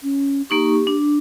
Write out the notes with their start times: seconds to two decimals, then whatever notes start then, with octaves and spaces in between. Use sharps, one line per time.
0.03 C#4
0.50 A#3 D#4 G4 C#6
0.87 D4